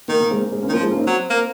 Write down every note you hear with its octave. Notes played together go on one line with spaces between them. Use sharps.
D#3 A#3
A#3
G#3 C4
A#3
G#3 C4
A#3 C#4
D#3
F3 A#3
G#3 C4
A#3 C#4
C4 D#4
F#3
A#3